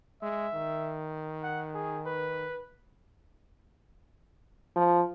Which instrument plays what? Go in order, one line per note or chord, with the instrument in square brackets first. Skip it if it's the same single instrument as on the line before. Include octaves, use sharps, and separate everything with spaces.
[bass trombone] G#3 [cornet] E5
[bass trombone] D#3
[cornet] F#5
G#4
B4
[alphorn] F3